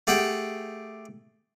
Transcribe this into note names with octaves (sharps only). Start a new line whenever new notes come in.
A3 G4 G#4 F#5 G5